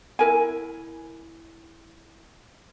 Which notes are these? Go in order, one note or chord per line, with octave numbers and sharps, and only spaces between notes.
E4 A#4 G#5